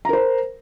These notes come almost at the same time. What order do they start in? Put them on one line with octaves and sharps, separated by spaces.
A#5 A#4 C5